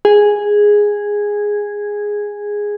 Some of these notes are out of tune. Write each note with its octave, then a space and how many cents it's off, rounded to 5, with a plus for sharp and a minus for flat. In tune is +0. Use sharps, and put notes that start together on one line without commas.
G#4 -5